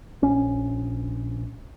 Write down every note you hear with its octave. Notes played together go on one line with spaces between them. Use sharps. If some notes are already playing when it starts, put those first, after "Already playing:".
A#1 C#4